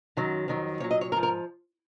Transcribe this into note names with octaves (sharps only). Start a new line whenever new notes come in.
F#2 D#3 F#3
F2 D#3 F#3
A#2 F#3 C#5
D#5
C#5
G#2 F3 A#4
A#4